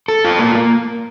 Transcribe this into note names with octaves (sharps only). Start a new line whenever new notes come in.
A4
F4
A#3
A#3